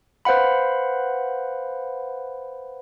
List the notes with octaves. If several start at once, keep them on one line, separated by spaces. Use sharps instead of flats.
B4 C5 F5 F#5 B5